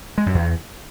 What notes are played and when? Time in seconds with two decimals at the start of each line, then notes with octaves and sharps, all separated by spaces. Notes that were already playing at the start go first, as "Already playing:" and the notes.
0.18 G#3
0.26 F#2
0.35 E2